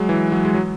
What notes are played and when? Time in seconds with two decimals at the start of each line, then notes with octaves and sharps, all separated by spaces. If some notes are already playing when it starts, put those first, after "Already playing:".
Already playing: F#3 G#3
0.09 E3
0.32 F#3
0.45 G#3
0.54 F#3